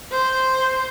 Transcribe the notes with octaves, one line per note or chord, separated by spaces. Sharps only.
C5